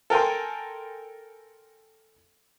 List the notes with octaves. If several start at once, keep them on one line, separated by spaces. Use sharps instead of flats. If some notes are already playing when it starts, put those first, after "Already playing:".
A4 A#4 G5 G#5 C6